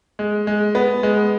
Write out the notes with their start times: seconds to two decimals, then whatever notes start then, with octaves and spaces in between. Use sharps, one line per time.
0.19 G#3
0.47 G#3
0.75 B3
1.03 G#3